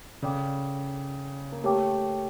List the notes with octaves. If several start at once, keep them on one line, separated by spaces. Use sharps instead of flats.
C#3 A4 D5 G5 D6
A#3
A3 G4 A#4 C#5 G5 D6